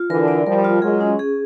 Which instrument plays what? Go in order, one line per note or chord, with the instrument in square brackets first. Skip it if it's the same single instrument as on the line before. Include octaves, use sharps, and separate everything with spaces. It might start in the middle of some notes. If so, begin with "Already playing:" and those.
Already playing: [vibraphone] F4
[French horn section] D3 E3 [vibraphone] A#4
[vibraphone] D5
[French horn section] F3 G3 [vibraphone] A#4
[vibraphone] F4
[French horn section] F#3 G#3 [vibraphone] G#4
[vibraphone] C#4
G#4